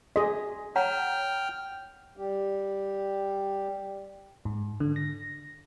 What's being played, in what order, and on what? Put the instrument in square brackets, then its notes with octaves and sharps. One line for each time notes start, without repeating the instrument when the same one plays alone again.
[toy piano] F#4 [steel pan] G#4 D#5
[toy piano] C#5 F#5 A#5 [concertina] G5 F6
[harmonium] G3 G4
[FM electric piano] G#2
D3
A#6